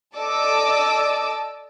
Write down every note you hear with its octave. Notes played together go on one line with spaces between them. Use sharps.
A4 D5 D#5 A5 D6 E6